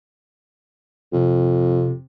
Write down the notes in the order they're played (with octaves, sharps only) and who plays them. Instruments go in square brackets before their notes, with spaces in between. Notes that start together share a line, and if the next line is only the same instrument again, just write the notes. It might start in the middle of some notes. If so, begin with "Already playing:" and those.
[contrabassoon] F2 [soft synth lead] C3